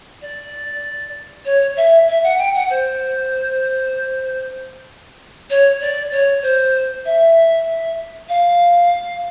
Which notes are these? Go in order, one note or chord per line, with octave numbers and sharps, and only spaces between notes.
D5
C#5
E5
E5
F#5
G5
F#5
C5
C#5
D5
C#5
C5
E5
F5